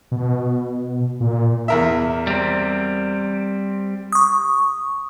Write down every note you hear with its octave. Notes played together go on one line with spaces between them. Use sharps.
B2
A#2
E2 A#4 E5
G3 C4
C#6 D#6